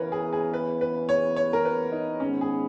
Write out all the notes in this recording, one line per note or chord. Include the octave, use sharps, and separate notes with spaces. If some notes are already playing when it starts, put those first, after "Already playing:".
Already playing: E2 C#3 E3 B3 A#4 B4 C#5
G#4
G#4
B4
B4
C#5
C#5
A#4
B4
D#4
G#2 D#3 G#3 B3 C#4
G#4